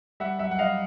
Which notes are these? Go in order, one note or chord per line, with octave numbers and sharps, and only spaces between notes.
G3 E5 F#5
F#2 E5 F#5
F#5
G3 D#5 F5